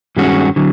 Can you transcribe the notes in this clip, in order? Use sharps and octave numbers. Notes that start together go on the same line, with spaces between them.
G2 D#3 G#3 C#4 F#4
D3 F#3